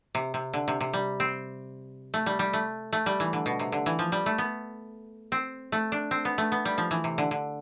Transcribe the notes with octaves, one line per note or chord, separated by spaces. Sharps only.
C3
C3
D3
C3
C3
G3
C4
A3
G3
G3
A3
A3
G3
E3
D3
B2
C3
D3
E3
F3
G3
A3
B3
C4
A3
D4
C4
B3
A3
B3
G3
F3
E3
C3
D3
D3